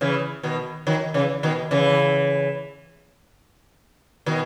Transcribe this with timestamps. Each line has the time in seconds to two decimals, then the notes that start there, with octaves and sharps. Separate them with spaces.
0.01 C#3 E3
0.43 B2 D#3
0.87 D#3 F#3
1.14 C#3 E3
1.43 B2 D#3
1.71 C#3 E3
4.26 B2 D#3